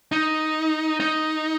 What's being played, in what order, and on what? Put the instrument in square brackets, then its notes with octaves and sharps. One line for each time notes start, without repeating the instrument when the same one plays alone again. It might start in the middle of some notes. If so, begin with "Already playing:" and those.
[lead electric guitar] D#4
D#4